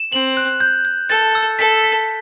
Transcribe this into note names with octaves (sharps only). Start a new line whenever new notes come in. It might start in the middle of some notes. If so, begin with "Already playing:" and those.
Already playing: E7
C4 F#7
F#6
G6
G6
A4 A6
E6
A4 B6
B6